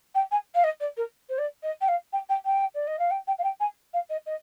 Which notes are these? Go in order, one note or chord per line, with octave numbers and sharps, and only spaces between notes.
G5
G#5
F5
D#5
D5
A#4
C5
D5
D#5
G5
F5
G5
G5
G5
D5
D#5
F5
G5
G5
F5
G5
G#5
F5
D#5
D#5